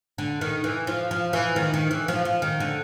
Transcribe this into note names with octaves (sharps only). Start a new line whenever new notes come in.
D3
D#3
E3
F3
F3
E3
D#3
D#3
E3
F3
F3
D#3
D3